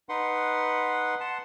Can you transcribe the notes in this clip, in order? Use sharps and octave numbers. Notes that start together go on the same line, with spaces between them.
D#4 B4 F#5 C6
F#5 A5 C6